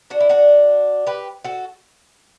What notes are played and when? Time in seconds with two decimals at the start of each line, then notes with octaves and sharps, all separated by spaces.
0.10 D4 F#4
0.20 E4
0.29 D4 F#4
1.07 G4 B4
1.44 F#4 A4